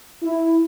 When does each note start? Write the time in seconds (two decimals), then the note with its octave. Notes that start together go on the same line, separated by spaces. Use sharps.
0.23 E4